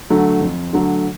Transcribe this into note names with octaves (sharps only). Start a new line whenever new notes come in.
D3 F#3 A3
F2
D3 F#3 A3